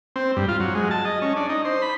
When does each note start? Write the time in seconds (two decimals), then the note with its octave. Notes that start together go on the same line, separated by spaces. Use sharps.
0.16 C4
0.36 G2
0.48 F4
0.60 F#3
0.75 G#3
0.91 A5
1.05 D#5
1.22 C#4
1.36 D4
1.49 D#4
1.65 C5
1.82 B5